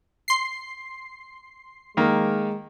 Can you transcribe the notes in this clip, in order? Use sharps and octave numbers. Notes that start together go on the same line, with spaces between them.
C6 C7
D#3 G#3 A#3